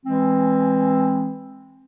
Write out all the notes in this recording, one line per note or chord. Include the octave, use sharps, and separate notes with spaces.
E3 G#3 C4